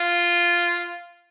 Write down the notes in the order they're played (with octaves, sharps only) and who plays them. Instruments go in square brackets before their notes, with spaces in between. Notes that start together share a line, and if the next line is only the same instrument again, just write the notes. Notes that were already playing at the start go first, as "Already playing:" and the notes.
Already playing: [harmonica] F4